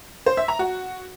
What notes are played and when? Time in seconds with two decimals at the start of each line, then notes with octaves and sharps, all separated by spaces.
0.26 C5
0.37 E5
0.48 A#5
0.59 F#4